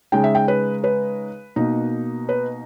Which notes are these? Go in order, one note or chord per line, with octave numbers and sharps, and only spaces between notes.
C#3 G#3 D#4 G5
E5
G5
B4
B4
B2 A#3 D#4
B4